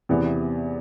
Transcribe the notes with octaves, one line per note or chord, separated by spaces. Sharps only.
E2 C3 E3 B3